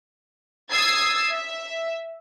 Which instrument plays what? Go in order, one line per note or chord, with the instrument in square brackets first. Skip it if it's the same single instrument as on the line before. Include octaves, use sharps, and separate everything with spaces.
[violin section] D#6 E6 G#6 A6 C7
E5